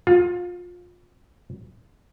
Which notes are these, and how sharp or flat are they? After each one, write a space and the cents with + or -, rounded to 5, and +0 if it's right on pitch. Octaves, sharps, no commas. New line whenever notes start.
F4 +25